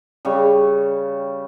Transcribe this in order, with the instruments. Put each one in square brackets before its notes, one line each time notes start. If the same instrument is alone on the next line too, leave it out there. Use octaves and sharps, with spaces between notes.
[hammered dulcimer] C#3 G3 C#5 C#6